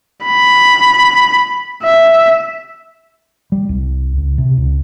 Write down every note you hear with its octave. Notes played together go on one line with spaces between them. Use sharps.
B5
E5
G3
C2
C#2
C3
C#2